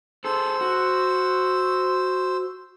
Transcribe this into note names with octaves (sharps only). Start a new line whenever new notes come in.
G#4 A4 C5 E6
F#4